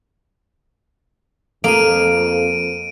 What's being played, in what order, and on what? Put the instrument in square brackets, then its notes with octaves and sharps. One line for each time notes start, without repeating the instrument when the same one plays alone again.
[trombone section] F2 [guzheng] A#3 [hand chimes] A4 [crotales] D7 D#7